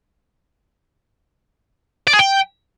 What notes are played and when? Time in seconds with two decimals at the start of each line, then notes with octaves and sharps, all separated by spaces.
2.07 D5
2.13 G#4
2.19 G5